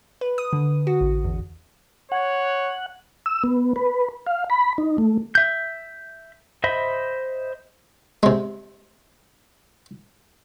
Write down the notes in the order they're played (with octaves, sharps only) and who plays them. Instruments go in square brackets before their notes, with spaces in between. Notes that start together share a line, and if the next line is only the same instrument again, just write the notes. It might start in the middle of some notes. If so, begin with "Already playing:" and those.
[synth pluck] B4
D#6
D3
F#4
A1
E2
[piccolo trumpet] C#5 [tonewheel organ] F#5
[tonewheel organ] E6
B3
B4
F5
B5
D#4
A3
[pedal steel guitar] E5 G6
C5 D#5 E5 B5
[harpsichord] C3 G#3